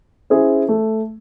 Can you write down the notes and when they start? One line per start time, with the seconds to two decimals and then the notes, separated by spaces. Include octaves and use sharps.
0.30 C#4 E4 G#4 C5
0.68 A3